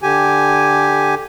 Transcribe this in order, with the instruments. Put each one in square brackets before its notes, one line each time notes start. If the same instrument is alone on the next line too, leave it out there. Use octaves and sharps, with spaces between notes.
[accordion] D3 G4 G#5